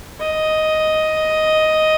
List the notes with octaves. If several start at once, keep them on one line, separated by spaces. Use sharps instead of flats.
D#5